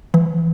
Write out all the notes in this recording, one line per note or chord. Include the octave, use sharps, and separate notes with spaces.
E3